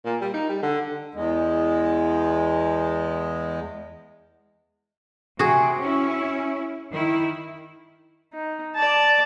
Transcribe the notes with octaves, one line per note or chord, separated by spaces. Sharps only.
A#2
G3
D#4
G3
D3
E2 G#3
C3 F#4 G#4
C#4 E4
D#3 E4
D#4
D5 A5